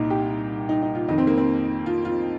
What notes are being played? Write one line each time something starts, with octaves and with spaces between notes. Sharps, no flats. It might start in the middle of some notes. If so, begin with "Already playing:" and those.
Already playing: C2 A#2 D#4
G4
D#4
D#4
F4
F2 D#3 D#4
C4
A#3
C4
F4
F4